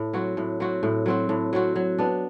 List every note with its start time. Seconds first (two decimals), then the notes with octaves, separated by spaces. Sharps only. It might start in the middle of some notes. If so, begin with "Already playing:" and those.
Already playing: A2
0.13 F#3 C4 F#4
0.37 A2
0.60 F#3 C4 F#4
0.83 A2
1.06 F#3 C4 F#4
1.29 A2
1.53 F#3 C4 F#4
1.76 F#3
1.98 B3 D4